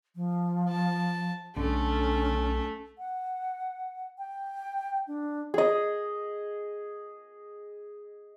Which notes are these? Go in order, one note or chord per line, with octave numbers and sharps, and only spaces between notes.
F3
A5
B1 D3 A3 C#4
F#5
G5
D4
G#4 D#5